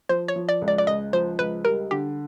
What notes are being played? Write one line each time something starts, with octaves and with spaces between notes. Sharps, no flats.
F3 C5
C#5
F3
D5
C#2
D5
D5
C#2 D#5
F3 C5
C#2 B4
G3 A#4
D3 G4